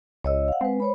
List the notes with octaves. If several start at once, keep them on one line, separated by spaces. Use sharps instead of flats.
C#2 C#5 D#5 E6
F5 F#5
G#3 C4 B4
C5 C#5 B5